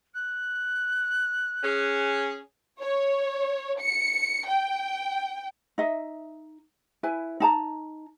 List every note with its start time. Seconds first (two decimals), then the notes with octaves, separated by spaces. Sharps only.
0.14 F#6
1.64 C#4 G#4
2.80 C#5
3.80 C#7
4.47 G5
5.78 D#4 D#5 E5
7.03 E4 B4 G#5
7.40 D#4 A5 A#5